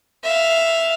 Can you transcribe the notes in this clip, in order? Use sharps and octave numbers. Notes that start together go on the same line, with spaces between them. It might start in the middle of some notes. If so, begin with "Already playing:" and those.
E5 F5